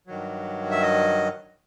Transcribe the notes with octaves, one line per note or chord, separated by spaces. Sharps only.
G2 D#3 F#3
E5
D#5